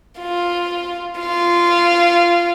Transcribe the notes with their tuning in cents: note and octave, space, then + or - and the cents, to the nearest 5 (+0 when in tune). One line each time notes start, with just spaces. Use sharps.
F4 +0
F4 -15